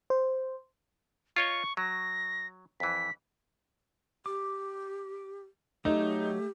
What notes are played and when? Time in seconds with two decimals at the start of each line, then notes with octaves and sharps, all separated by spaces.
0.10 C5
1.36 F4 C#5 D#5 C#6
1.77 F#3 A#6
2.80 F2 E3 B6
4.26 G4 D6
5.85 F#3 A3 D#4 G4 A4 C#5